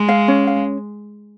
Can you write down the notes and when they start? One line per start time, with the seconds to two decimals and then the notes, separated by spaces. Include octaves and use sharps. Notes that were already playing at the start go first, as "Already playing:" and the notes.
Already playing: G#3
0.09 F5
0.28 C#4
0.47 F5